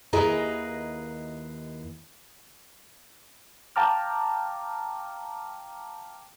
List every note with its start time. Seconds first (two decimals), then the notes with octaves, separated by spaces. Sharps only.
0.13 D#2 E4 G#4 B4 D#5 A#5
3.76 F5 G5 A5 A#5 D6 F6